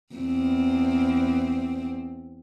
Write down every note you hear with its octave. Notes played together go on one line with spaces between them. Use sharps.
E2 C4